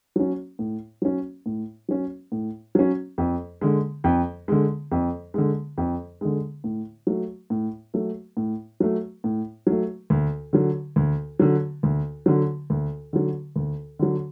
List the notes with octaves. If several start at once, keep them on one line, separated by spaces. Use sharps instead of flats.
F#3 C#4
A2
F#3 C#4
A2
F#3 C#4
A2
F#3 C#4
F2
D3 G#3
F2
D3 G#3
F2
D3 G#3
F2
D3 G#3
A2
F#3 A3
A2
F#3 A3
A2
F#3 A3
A2
F#3 A3
D2
D3 F#3
D2
D3 F#3
D2
D3 F#3
D2
D3 F#3
D2
D3 F#3